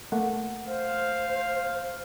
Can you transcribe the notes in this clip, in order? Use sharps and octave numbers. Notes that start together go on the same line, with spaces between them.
A3 A#3 F#5
C5 F5